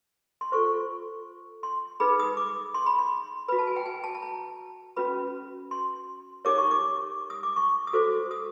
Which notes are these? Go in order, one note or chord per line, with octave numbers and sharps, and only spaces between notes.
C6
F4 A4 C5 C#6
C6
D#4 G#4 B4 B5
D#6
D6
C6
B5
C6
F#4 B4 B5
A5
G#5
G5
G#5
A5
A5
A#5
C#4 F#4 B4 B5
C6
D#4 G4 A#4 C#5 D6
C#6
D6
D#6
D6
C#6
D#6
F#4 A4 C5 D6
D#6